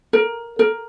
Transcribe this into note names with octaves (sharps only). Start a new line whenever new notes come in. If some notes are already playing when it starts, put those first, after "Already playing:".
A#4
A#4